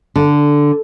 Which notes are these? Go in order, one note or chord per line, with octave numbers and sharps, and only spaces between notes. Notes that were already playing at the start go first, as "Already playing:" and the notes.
D3